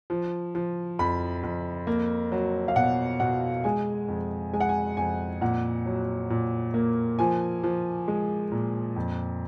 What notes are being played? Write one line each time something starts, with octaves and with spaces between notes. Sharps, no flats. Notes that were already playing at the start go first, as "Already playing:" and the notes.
F3
F3
F2 B5
F2
A#3
F#3
F5
B2 F#5
B2 F#5
G#3 G#5
F2
G#3 G#5
F#5
G#5
F2 G#5
A#2 F#5
F#3
A#2
A#3
F3 G#5
F3
G#3
A#2
F2